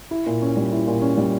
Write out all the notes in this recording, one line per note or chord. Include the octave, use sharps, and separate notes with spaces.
E4
A#2
C#4
G3
E4
A#2
C#4
G3